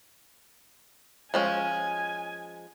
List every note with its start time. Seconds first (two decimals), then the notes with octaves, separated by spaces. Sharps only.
1.34 F3 G#3 C#4 G#5